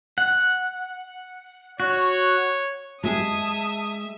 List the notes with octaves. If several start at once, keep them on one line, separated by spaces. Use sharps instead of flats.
F#5
F#4 C#5
G#3 G#4 E5 A5 D#6